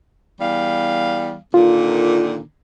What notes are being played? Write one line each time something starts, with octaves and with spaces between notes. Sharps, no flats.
E2 G3 F5
A#2 D3 D#3 F4